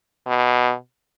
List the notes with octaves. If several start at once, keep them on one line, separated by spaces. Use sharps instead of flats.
B2